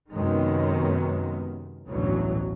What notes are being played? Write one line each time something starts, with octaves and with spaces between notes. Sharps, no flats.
F#2 C3 D#3 G#3 B3
A1 D2 G2 B2 E3 F#3